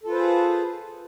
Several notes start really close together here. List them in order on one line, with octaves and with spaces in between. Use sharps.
A4 F4 B4 C5 G#4